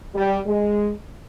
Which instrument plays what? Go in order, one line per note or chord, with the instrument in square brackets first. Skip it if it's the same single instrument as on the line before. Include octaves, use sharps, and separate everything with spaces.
[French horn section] G3
G#3